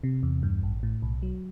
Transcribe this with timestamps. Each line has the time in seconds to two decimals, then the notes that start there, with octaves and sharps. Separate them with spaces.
0.04 C3
0.23 E2
0.43 G2
0.63 A1
0.83 A2
1.02 B1
1.23 F#3